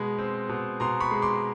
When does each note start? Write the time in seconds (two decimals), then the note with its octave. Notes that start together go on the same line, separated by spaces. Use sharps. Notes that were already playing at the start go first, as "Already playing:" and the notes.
Already playing: B2 G#3 B5
0.19 C4
0.49 B2
0.80 B2 A#5 C6
1.00 B5 C#6
1.11 G#3
1.22 C6 D6